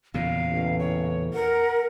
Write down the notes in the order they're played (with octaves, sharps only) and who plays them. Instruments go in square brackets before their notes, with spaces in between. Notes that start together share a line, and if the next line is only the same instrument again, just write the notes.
[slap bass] E2 A#2 C#3 [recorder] F5
[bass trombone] A1
[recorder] C#5
[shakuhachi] A#4 [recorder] F#5